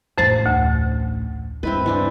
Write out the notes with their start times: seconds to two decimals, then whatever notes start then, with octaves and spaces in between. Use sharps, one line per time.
0.18 A1 F2 C#4 C5 A6
0.46 D2
1.63 G2 C4 E4 B4
1.86 E3 C4 D4